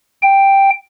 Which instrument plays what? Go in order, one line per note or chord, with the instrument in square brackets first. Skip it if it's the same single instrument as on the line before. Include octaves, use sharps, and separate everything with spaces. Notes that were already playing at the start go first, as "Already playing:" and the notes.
[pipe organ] G5